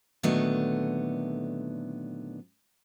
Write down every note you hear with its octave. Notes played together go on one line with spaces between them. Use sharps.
A#2 D3 D#3 F#3 A3 B3